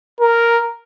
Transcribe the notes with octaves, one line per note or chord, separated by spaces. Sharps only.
A#4